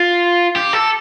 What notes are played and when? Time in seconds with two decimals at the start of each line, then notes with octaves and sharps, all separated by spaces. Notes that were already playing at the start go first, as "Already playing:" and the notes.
Already playing: F4
0.56 G4
0.73 A4